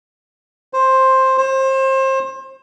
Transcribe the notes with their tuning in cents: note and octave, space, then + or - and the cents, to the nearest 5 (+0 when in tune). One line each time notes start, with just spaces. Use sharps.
C5 +10
C5 +30